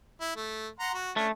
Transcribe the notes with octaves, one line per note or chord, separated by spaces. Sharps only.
E4
A3
F#5 A#5 C6
F#4
A3 C#4 D4